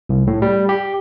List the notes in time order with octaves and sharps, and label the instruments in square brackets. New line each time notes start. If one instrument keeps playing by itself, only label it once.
[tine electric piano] C2
A2
G3
G4